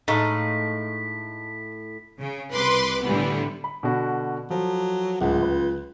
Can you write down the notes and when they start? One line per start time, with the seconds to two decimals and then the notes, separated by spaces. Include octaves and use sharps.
0.08 A2 G#3 A3 D#4 F5 B6
2.19 C#3
2.52 C2 B4 C6 D6
3.03 A2 D3 E3 G3 B3
3.64 B5
3.83 B2 D3 F#4
4.50 F3 F#3 A4
5.21 D1 C#2 G#3 F#5
5.42 B4